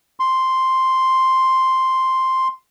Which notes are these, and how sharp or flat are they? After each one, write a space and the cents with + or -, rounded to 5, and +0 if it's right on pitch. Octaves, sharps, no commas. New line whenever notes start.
C6 +0